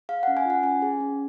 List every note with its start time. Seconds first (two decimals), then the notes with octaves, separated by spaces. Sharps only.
0.09 G#4 F5
0.23 C#4 F#5
0.37 G#5
0.45 F4 F#5
0.63 C#4 G#5
0.82 G#4
1.00 C#4